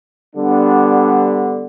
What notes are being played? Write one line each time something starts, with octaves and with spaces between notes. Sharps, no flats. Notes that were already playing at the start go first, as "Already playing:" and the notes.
D3 G3 B3 D4